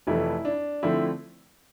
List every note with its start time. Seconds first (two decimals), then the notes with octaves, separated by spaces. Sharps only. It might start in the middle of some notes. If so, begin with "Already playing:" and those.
0.07 F1 F2 E3 A3 E4
0.45 D4
0.83 D3 F3 A3 C4 E4